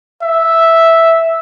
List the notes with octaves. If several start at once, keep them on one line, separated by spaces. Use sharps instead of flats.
E5